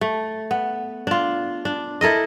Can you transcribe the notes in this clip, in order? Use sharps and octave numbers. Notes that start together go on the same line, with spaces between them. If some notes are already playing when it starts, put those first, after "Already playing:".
A3
B3
D4 F4
D4
E4 A4 A#4 D#5